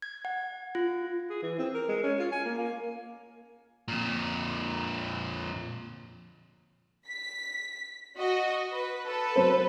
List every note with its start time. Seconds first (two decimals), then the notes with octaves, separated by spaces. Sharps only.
0.02 G#6
0.25 F#5
0.75 F4
1.30 G#4
1.43 E3
1.59 C4
1.74 A#4
1.88 G#3
2.03 C#4
2.19 F4
2.32 G#5
2.45 A#3
2.58 A#3
3.88 F2 A#2
7.07 B6
8.18 F#4 D#5
8.73 B4
9.07 A4 B4
9.36 F#3 C5